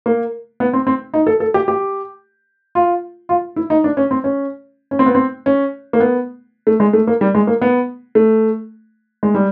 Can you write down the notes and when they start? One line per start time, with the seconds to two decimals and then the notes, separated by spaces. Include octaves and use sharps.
0.06 A#3
0.60 B3
0.73 C4
0.87 C4
1.14 D#4
1.27 A4
1.40 A4
1.54 G4
1.68 G4
2.75 F4
3.29 F4
3.56 E4
3.70 D#4
3.84 D4
3.97 C#4
4.11 C4
4.24 C#4
4.91 C#4
4.99 C4
5.06 B3
5.15 C4
5.46 C#4
5.93 A#3
6.00 B3
6.67 A3
6.80 G#3
6.93 A3
7.07 A#3
7.21 G3
7.35 G#3
7.47 A#3
7.62 B3
8.15 A3
9.23 G#3
9.34 G3